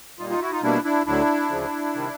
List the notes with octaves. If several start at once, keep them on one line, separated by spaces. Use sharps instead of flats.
A#2 G3 A#3 D#4 F4
D#4 F4
E4 F#4
D#4 F4
B2 G3 A#3 D4 E4
D4 E4
D2 D3 F#3 D4 E4
D2 C#3 F3
C3 D#3 G3